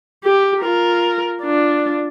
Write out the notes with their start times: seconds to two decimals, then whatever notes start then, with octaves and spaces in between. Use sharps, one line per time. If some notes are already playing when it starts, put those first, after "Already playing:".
0.24 G4
0.61 F4 A#4
1.42 D4 F4